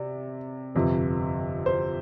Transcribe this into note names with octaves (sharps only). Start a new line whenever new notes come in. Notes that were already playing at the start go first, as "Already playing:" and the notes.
Already playing: C3 D5
G1 F2 C3
C5